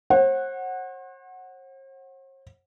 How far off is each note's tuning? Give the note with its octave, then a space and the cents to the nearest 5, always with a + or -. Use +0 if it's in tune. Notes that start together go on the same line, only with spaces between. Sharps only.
C5 +45 F#5 +0